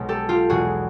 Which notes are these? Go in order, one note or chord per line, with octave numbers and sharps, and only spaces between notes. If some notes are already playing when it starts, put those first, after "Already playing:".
Already playing: B1 B2 G#3
G4 A4
F4 G4
E2 B2 G#3 F#4 G#4